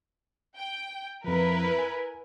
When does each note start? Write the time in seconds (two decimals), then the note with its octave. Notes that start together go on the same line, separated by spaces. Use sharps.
0.57 G5
1.24 F2 F3 E4 A#4 B4
1.79 G#5